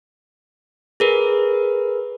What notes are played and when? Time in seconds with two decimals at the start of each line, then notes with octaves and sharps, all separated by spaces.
1.00 G#4 A#4 B4